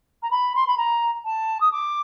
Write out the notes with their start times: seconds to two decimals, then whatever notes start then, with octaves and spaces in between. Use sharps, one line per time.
0.22 A#5
0.30 B5
0.55 C6
0.66 B5
0.77 A#5
1.25 A5
1.60 D#6
1.71 D6